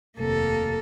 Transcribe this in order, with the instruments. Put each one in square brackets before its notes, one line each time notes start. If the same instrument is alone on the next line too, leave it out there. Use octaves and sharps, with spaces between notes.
[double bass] F1 D#2 [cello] A#3 A4